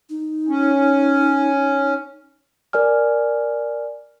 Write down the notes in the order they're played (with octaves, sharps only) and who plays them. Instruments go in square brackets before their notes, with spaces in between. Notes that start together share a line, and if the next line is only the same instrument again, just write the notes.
[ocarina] D#4
[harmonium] C#4
[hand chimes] A#4 D5 G#5 F6